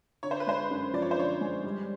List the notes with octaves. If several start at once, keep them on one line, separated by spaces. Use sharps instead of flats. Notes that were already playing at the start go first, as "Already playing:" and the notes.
D3 C#5
C5
B4
G#3 C5
F#2
F3 D5
C#5
C5
D3 C#5
G#3
G3